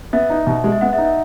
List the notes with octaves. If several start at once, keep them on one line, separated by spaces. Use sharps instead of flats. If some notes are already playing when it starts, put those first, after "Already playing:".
B3 E5
D#4
B2
G#3
E5
B3 F#5
E5
D#4
E5